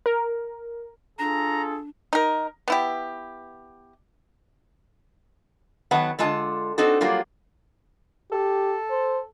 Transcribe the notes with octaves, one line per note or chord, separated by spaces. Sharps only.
A#4
D4 F4 G#4 A4 A#5
D#4 A#4
B3 E4 G4
D#3 F#3 B3 B4 F#5 A5
D3 G#3 F4 A5
C4 D4 D#4 F#4 A4
F#3 G3 A#3 F4
G4 A4
C5